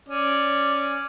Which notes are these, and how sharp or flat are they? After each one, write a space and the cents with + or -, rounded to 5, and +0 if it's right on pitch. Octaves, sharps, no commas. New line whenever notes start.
C#4 +0 D5 +0